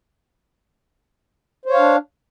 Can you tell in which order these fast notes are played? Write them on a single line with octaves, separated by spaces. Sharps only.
C5 C#5 F5 D4